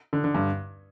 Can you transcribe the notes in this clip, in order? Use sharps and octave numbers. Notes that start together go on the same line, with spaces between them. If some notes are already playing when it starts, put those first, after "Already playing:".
D3
D3
G2